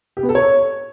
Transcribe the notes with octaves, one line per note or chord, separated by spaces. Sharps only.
G4
B3
A4
C#5